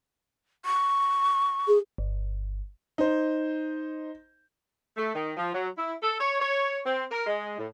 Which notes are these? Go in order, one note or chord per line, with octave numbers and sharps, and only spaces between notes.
C#6
G#4
G1
D#4 C5
A3
D#3
F3
F#3
E4
A4
C#5
C#5
C4
A#4
G#3
A2